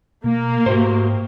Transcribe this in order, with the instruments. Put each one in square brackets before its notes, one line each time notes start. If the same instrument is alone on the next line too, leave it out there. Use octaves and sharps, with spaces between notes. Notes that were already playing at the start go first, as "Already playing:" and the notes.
[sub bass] B2 [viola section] A#3
[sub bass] G#2 [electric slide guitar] F#4 G4 C5